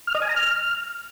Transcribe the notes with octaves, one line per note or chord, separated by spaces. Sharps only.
F6
D#5
G#5
A#5
F6